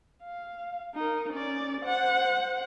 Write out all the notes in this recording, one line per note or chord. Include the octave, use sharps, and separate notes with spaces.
F5
D#4 A#4
C#4 D5
C5 F#5